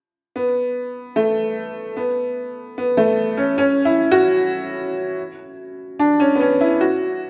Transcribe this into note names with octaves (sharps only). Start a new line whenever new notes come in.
B3
A3
B3
B3
A3
C#4
C#4
E4
F#4
D4
C#4
B3
C#4
E4
F#4